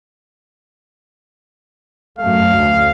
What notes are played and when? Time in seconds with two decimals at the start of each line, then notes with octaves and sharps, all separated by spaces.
2.19 F#2 A3 F5
2.55 D2